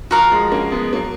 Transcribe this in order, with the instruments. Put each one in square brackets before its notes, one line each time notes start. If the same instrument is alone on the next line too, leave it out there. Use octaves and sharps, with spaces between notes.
[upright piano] F3 [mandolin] F#4 A#4 F5
[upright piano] F3 G#3
A#3 C#4
G#3 B3
F#3 A#3